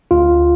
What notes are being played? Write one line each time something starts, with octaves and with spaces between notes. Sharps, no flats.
D2 F4